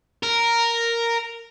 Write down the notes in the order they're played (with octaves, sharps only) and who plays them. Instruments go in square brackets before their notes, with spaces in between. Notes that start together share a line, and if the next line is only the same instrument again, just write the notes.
[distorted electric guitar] A#4